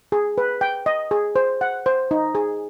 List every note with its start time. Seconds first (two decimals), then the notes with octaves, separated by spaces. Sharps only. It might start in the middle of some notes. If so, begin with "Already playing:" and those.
0.12 G#4
0.38 B4
0.61 G5
0.86 D#5
1.11 G#4
1.36 C5
1.61 F#5
1.86 C5
2.11 D#4
2.35 G#4